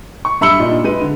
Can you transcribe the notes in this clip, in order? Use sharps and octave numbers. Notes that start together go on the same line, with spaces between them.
C#6
G2 E5 B5 E6 C#7 G7
A#2 D4 D#4
G#3 B4 D#7
D3